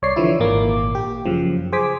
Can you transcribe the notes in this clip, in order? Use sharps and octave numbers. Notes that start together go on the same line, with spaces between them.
C2 C#5 D5 C7
D3 E3 F3 E4
G#1 A#2 A#3 D6
G4
F#2 C#3 F3
G#4 C5 G#5 D6 B6